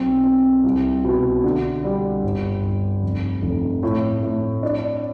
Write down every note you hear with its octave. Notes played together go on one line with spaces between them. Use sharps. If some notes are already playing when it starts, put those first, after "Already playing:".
Already playing: B1 C4
C4
C2
B2
D3
G3
G1
G1
F1
F1
A2
A2
D4